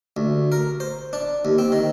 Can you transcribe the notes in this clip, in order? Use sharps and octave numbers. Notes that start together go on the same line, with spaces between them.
D2
A#4
C5
D4
D#2
C4
D#3